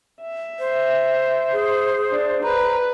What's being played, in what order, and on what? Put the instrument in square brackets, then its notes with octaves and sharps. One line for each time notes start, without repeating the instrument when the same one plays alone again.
[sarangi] E5
[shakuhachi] C5
[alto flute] G#4
[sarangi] D4
[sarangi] B4 [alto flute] A#5